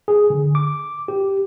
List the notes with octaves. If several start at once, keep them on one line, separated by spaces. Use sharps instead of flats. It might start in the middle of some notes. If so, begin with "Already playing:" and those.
G#4
D3
D6
G4